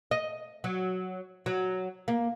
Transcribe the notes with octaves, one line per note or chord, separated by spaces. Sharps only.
D#5
F#3
F#3
A#3